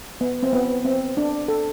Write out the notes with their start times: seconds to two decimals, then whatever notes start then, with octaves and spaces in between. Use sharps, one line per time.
0.21 B3
0.43 C4
0.53 B3
0.85 C4
1.17 D4
1.48 A4